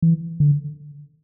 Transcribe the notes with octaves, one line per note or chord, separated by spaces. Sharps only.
E3
D3